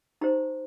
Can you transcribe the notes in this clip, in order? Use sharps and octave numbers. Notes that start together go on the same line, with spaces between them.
D#4 G4 C5 A#5